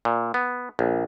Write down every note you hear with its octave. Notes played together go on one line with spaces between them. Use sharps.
A#2
B3
A#1